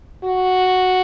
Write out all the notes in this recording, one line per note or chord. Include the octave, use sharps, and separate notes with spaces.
F#4